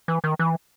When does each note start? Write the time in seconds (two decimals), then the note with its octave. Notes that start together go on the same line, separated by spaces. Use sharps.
0.08 E3
0.24 D#3
0.39 E3